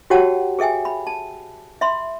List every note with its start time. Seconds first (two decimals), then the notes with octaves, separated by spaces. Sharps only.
0.10 F#4 G4 C#5 F#5 G5 A5
0.59 G#4 A4 E5 G5 G#5
0.85 B5
1.07 A5
1.81 E5 B5 C6